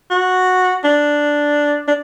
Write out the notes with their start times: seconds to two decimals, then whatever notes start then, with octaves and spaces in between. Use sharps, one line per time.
0.11 F#4
0.84 D4
1.88 D4